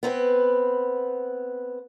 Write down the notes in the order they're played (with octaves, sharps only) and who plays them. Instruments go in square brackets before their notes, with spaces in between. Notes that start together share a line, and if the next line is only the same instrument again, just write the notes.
[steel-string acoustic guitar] B3 C4 B4